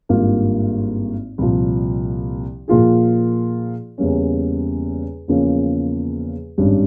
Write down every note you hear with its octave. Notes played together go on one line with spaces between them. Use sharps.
G#1 G2 G3 A#3 F4
C2 A#2 F3
A#2 F3 A#3 F4 G#4
E2 C#3 G3 A#3 C#4
E2 C#3 F3 A#3 C#4
G#1 G2 G3 C#4